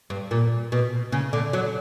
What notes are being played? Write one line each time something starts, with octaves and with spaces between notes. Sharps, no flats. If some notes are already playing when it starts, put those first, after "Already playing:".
G2
A#2
B2
C#3
D3
F#3